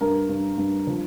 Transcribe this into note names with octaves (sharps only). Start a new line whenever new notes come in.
G2 A#4
G2
G2
F3